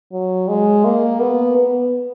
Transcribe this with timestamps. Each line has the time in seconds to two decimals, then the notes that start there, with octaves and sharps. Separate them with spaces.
0.12 F#3
0.48 G#3
0.85 A#3
1.20 B3
1.57 B3